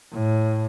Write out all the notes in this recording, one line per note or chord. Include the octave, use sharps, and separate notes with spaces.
A2